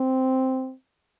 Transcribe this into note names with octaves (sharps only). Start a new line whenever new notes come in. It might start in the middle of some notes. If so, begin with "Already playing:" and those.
Already playing: C4